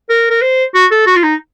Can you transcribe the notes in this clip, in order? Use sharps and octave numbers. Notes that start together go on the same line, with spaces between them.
A#4
A#4
C5
F#4
A4
F#4
F4
D#4